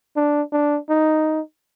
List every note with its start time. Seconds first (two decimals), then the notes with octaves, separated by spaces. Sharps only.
0.16 D4
0.52 D4
0.89 D#4